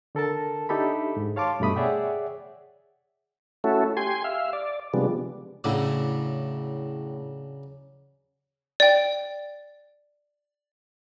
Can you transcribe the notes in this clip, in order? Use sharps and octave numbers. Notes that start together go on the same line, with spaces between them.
D3 A4 A#4 A5
D4 D#4 G4 A4 E5 B5
G#2
C#5 F5 A5 C6 D6
G2 B2 A3 B5 D#6
G#4 C#5 D5 E5 F#5 G5
A3 C#4 E4 F#4 A4
G4 G#5 C6
E5 F5
D5
C3 F3 G3 G#3 B3 D4
A2 C#3 F#3 D4 E4
D5 G5